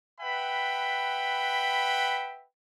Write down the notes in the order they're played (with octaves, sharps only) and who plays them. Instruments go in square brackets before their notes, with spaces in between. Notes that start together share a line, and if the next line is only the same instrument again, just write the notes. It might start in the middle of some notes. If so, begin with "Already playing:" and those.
[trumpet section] B4 E5 F#5 G5 B5